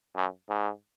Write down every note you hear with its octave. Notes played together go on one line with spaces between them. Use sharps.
F#2
G#2